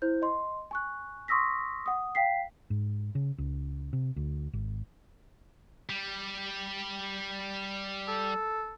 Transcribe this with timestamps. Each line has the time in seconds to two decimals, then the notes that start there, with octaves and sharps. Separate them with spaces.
0.02 E4 C5 G6
0.22 D#5 C6
0.71 G#5 C#6 F#6
1.28 C6 C#6 D#6 E6 A#6 B6
1.86 F#5 D#6
2.15 F5 G5 B6 C7
2.70 G#2
3.15 C#3
3.38 C#2
3.93 C3
4.16 D2
4.53 G#1
5.89 G3
8.08 A4